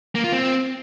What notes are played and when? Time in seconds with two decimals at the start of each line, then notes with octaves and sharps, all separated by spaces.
0.15 A#3
0.24 F4
0.33 C4